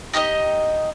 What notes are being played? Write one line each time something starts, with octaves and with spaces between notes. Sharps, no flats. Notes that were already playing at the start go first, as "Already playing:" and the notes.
D#4 G4 C5 D#5